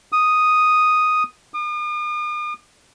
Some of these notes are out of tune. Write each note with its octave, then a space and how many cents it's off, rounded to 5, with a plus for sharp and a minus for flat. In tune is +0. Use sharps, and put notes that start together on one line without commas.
D#6 +0
D#6 -45